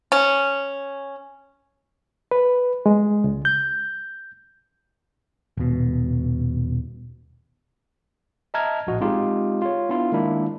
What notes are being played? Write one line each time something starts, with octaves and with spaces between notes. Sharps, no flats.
C#4
B4
G#3
C#2
G6
D#1 B2
D#5 E5 A5 A#5 F6 G#6
A#1 A2 F#4 D#5
G#3 C4 D#4 F4 G4 G#4
F4 C#5
B3 D4 E4 F4
D#3 G#3 A#3 D4 E4